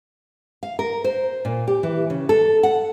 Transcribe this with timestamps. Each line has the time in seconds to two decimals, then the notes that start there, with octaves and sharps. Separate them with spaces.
0.63 F5
0.79 A#4
1.04 C5
1.45 A#2
1.68 G4
1.83 E3
2.10 C#3
2.29 A4
2.63 F#5